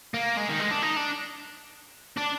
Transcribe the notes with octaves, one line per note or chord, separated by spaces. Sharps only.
A#3
G#3
D#3
G#3
D4
D#4
D4
D4